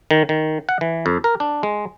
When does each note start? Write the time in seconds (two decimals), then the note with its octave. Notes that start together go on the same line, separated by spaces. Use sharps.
0.11 D#3
0.29 D#3
0.69 F#5
0.81 E3
1.06 F2
1.24 A#4
1.40 D4
1.63 G#3